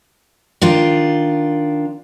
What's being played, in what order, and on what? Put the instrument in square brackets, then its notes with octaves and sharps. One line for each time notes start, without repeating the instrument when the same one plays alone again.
[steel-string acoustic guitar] D#3 D4 F4